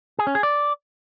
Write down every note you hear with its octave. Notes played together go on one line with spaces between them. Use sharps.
G#4
C#4
G#4
D5